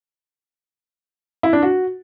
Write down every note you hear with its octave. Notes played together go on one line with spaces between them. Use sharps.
E4
D4
F#4